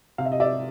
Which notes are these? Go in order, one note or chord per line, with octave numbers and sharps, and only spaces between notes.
C3 F5
E5
D#5
D5 E5